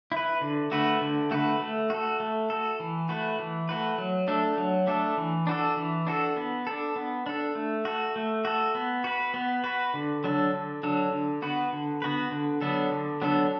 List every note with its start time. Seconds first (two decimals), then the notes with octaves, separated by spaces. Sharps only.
0.12 E4 B4
0.41 D3
0.71 A3 F#4 B4
1.01 D3
1.31 A3 F#4 B4
1.60 A3
1.90 F#4 A4
2.20 A3
2.50 F#4 A4
2.80 E3
3.09 A3 F#4 B4
3.39 E3
3.69 A3 F#4 B4
3.98 F#3
4.28 A3 D4 A4
4.58 F#3
4.87 A3 D4 A4
5.17 E3
5.47 D4 F#4 A4
5.77 E3
6.07 D4 F#4 A4
6.37 B3
6.67 D4 A4
6.96 B3
7.26 D4 A4
7.55 A3
7.85 F#4 A4
8.16 A3
8.45 F#4 A4
8.75 B3
9.04 F#4 B4
9.34 B3
9.64 F#4 B4
9.94 D3
10.24 F#3 D4 A4
10.53 D3
10.83 F#3 D4 A4
11.12 D3
11.42 B3 F#4 B4
11.72 D3
12.02 B3 F#4 B4
12.31 D3
12.61 F#3 B3 D4 A4
12.91 D3
13.22 F#3 B3 D4 A4